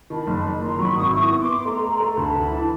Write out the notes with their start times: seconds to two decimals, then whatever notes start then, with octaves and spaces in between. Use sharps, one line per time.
0.10 D#3 A5 B5
0.27 F#1
0.45 F#1
0.61 D#3 A#5 C6
0.79 F#3 B5 C#6
0.96 G#1 C#6 D#6
1.08 E6
1.14 E4 C#6 D#6
1.31 B3
1.40 C6 D6
1.48 B3
1.65 A3 A#5 C6
1.83 A3
1.91 A#5 C6
2.00 A3
2.17 D2 A5 B5
2.35 D2
2.52 E3